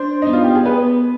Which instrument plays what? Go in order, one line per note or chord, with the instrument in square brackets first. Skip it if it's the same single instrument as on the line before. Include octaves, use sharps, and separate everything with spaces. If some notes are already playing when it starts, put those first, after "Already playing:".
Already playing: [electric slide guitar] D4 [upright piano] C5
[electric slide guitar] B3 [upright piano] D#4
[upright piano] F4
G4
G#4
[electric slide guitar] B3 [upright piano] B4